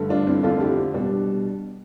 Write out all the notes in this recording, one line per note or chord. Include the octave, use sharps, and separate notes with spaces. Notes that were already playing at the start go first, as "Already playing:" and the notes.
Already playing: G2 D3 A3
D4 F4
C4 E4
F2 D3 A3 D4 F4
E4 G4
C4
B2 G3 D4